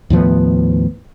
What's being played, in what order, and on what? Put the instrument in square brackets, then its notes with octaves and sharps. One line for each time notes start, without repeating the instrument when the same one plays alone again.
[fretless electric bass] D#2 A2 F3 B3